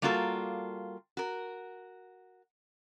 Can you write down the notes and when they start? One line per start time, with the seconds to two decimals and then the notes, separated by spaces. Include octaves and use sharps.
0.02 G3 A#3 F4 F#4 A4 A#4
1.17 F#4 A#4